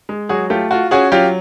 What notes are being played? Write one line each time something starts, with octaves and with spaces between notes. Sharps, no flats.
G#3
F#3 F#4 G#4
A3 F4 G4
F4 F#4
C#4 F#4 G#4
F#3 F4 G4